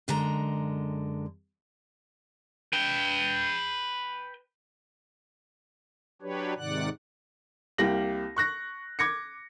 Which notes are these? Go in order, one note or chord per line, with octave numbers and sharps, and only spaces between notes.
F#2 D3 G#3 A#5
B4 G5
F#3 D4 G4 B4 C#5
G#2 C3 D#3 D5 F#5 F#6
C2 A#3 G4 F5 A#6 F#7
C#6 F#6 A#6
D6 G#6 A#6 C#7